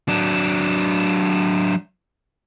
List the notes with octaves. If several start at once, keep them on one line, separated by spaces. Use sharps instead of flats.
F#3 D4